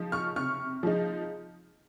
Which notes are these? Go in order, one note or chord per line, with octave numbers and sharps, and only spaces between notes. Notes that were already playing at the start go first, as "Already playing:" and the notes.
Already playing: F3 G#3 D#4
C#6 F6
C3 C#6 F6
F3 G#3 D#4